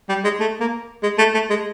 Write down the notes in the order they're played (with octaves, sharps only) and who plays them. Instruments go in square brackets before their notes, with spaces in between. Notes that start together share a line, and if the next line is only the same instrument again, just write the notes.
[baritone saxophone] G3
G#3
A3
A#3
G#3
A3
A3
G#3